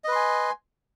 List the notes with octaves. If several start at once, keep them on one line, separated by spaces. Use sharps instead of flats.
B4 D#5 G#5 C6